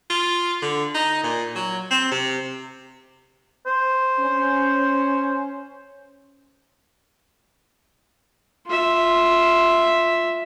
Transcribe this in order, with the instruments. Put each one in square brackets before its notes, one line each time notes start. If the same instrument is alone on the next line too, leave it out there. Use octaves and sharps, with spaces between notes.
[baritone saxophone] F4
D3
D#4
A#2
F#3
C4
C3
[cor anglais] C5
[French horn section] C#4
[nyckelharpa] F4 E5